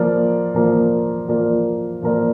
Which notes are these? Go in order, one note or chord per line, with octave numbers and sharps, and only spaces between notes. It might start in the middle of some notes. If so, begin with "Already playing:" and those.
Already playing: F3 A#3 F4 A#4 D5
F3 A#3 F4 A#4 D5
F3 A#3 F4 A#4 D5
F3 A#3 F4 A#4 D5